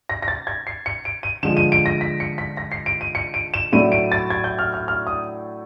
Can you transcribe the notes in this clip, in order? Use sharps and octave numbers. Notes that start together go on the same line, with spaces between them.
A#6
A#6
A6
G#6
C7
C#7
D7
D#7
D3 F3 G#3 E7
D#7
D7
A#6
B6
C#7
B6
A#6
C7
D7
D#7
C#7
D7
E7
A2 F#3 A3 D4 D#7
D7
A6
G#6
G6
F6
F6
F6
D#6